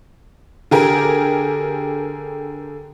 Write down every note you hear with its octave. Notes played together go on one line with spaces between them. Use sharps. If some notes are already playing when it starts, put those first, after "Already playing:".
D3 G4 G#4 A#4